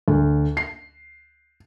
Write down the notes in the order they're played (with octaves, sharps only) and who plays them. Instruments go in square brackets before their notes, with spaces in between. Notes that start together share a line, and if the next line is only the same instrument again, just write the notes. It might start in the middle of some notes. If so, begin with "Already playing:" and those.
[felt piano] D2
C7